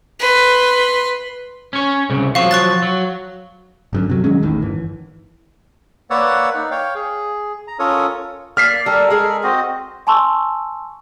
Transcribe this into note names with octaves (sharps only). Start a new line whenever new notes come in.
B4 C6
C#4 C#5
C2 C#3
F3 F#3 F5 C#6
C#6 F#6 A6
F#3
G#1 F#2 D3
C3 F#3
D#3 F#3 G#3 C#4
A1 E2 A2 D#3
G1 E3
A#3 B4 C#5 D5 F#5 E6
D#4
C#5 F5 G5
G#4
A#5
C#4 F4 A4 A#4 C#5 D#6
A#3 D5 F6 B6 C7
G3 A4 A#4
G#3 G#4
C4 F#4 D#5
G#5 A5 C6 C#6 E6